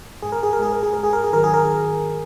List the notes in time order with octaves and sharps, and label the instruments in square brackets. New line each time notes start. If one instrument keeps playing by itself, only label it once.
[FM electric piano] G#2 G#4
A#4
G#4
A#4
G#3 G#4
A#4
G#4
G#2 A#4
G#4
A#4
G#4
D#3 F#3 A#4
G#4
A#4